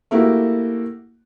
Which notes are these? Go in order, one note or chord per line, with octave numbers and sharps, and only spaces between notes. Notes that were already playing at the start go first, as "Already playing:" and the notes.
A3 A#3 E4 F#4 G4